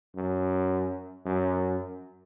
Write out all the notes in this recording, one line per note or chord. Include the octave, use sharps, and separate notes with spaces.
F#2
F#2